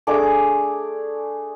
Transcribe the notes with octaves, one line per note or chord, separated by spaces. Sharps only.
A3 D4 G#4 D6